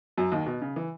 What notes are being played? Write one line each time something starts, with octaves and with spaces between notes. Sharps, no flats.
F#2 F#3
D#2 D#3
B2
C#3
E3